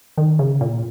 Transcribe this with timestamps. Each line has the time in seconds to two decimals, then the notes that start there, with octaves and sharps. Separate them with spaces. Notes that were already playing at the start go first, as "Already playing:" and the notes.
0.18 D#3
0.39 C#3
0.61 A#2